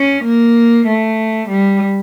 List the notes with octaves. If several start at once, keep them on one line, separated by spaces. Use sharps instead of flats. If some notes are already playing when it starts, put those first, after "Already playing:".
Already playing: C#4
A#3
A3
G3